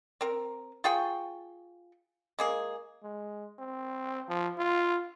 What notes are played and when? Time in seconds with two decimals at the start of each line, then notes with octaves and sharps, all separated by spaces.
0.21 C4 A#4
0.84 F4 G#4 G5 C#6
2.39 G#3 A#3 G#4
3.03 G#3
3.59 C4
4.28 F3
4.58 F4